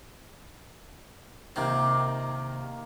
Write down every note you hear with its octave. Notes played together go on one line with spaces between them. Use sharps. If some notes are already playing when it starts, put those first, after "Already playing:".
C3 D#3 A#3 C4